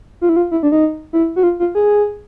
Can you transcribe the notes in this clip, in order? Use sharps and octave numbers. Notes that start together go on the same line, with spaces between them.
F4
E4
F4
E4
D4
D#4
E4
F#4
F4
F4
G#4